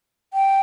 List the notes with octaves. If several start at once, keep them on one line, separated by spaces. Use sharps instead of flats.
G5